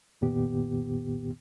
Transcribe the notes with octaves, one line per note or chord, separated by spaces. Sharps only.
C2 F2 A#2 D#3 B3 G4